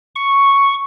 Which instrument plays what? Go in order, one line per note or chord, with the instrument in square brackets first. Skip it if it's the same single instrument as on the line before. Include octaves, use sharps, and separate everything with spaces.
[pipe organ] C#6